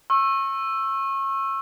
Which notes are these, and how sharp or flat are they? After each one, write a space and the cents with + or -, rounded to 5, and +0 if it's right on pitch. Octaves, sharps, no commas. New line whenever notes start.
C#6 -30 E6 +10